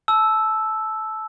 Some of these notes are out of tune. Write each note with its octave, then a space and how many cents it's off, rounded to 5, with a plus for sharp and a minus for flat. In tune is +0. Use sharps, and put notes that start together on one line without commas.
A5 -20 E6 +0